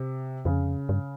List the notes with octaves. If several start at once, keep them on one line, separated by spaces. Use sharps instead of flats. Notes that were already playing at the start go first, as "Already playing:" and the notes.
Already playing: C3
F2 C#3
G2